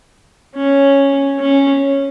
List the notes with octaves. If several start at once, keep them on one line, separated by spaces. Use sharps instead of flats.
C#4
C#4